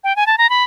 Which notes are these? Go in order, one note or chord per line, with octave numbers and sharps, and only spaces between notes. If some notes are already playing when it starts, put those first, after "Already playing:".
G5
G#5
A5
A#5
B5